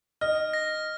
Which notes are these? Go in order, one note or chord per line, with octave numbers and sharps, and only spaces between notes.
D#5 F6
A#6